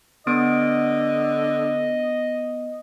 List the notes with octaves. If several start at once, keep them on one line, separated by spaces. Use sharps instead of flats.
D3 B3 D#5 D#6 D7